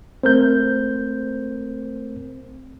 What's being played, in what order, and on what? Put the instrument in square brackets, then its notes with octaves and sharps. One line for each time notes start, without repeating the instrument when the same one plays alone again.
[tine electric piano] A3 A#4 C5 [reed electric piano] C4 G6